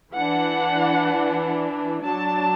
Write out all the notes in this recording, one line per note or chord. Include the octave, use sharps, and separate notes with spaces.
E3 D4 F#5
F#3 D4 A5